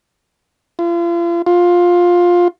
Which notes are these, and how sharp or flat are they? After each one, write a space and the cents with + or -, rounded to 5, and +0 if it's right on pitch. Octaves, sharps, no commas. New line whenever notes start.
F4 -40
F4 +10